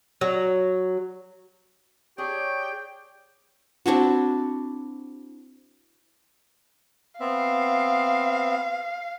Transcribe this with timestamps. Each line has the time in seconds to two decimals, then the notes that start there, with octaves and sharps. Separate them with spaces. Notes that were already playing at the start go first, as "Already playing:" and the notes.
0.21 F#3
2.18 D4 G4 G#4 C#5 G5
3.86 C4 D4 E4 F#4
7.20 B3 C4 E5 F5